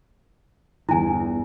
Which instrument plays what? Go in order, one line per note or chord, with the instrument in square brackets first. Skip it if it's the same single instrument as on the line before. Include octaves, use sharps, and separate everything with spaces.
[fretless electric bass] G1 E2 [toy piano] E4 G#5